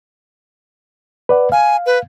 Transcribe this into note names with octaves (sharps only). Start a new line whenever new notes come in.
B4 D5 F#5
F5 G#5
B4